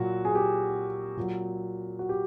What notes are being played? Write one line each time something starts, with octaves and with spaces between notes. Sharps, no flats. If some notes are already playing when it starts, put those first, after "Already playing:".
Already playing: A#2 F#3 F#4
G#4
G4
A#2 F#3
F#4
G4